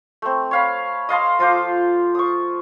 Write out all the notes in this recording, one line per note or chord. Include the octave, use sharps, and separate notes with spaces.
A3 C4
C#5 F5 B5
D#5 F5 A5 C6
F3 F4 C5 D6
C#6 D#6